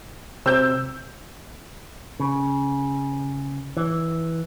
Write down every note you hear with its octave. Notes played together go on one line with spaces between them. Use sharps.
C3 C4 E6 G6
C#3
E3